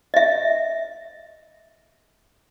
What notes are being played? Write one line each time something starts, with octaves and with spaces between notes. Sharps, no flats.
D#5 E5